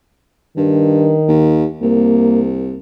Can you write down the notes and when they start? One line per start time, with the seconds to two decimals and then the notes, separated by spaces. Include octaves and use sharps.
0.57 G2 D#3
1.28 D#2
1.82 C2 A#3